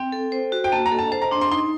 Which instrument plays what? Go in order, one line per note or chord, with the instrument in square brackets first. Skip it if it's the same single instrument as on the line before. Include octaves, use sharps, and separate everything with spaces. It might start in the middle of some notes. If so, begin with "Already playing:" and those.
Already playing: [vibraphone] C4 [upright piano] G5
[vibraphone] A4
C5
F#4
[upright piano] G5
[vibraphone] A#3 [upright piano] A5
[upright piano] A#5
[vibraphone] A4
[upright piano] A5
[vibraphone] C5 [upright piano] A5
[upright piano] A#5
[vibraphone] D4 [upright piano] C6
[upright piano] C6
[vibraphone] D#4 [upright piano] C6